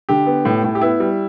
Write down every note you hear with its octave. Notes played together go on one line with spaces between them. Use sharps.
D3 G4
B3
A2
A2
G4
B3 E4
G3